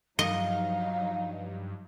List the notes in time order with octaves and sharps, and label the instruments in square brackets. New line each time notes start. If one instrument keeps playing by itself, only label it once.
[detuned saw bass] G2 [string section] F3 F#3 D#4 [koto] D#5 [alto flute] F5